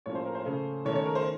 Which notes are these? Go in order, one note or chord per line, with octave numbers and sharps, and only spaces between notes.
A2 F3 A#3 C#4 C#5
C5
A#4
C5
C#3 A3 C#4
D#3 A3 C#4 C#5
C#5
A#4
C5